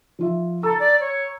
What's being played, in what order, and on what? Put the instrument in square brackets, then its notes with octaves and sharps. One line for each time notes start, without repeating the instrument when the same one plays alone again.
[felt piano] F3 F4 E5
[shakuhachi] A4 [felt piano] A#5 E6
[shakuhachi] D5
C#5